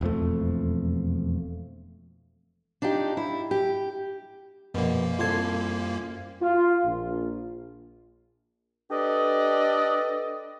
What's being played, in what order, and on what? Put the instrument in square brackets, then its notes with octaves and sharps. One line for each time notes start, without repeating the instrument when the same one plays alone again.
[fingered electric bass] E1 F2 F3 A3
[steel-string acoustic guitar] D4 D#4 F4 G4
E4
G4
[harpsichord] A#1 B2 [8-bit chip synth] F#2 A#3
[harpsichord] C2 A4 C6 [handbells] F4 G#6
[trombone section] F4
A#1
[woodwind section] D4 G4 A4 B4 D5 D#5